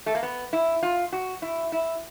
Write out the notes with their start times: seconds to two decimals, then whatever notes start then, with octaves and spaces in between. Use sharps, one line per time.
0.06 A3
0.15 A#3
0.23 B3
0.53 E4
0.83 F4
1.12 F#4
1.42 E4
1.72 E4